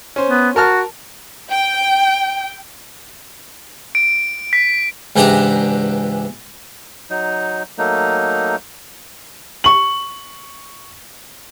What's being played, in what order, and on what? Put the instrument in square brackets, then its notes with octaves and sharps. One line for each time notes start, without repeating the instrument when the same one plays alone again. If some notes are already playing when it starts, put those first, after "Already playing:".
[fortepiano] C#4 C5
[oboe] B3
[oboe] F#4 [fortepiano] A#4 A5 F6
[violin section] G5
[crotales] D7
B6
[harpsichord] C#2 G#2 E3 D4 G4 A#5
[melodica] F#3 D#4
F#3 A3 A#3 D#4
[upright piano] C#6 F#7